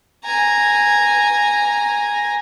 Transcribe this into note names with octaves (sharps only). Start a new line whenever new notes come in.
G#5 A#5